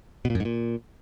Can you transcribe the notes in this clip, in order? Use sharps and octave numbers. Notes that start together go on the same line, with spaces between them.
B2
A#2
F#2
G#2
A#2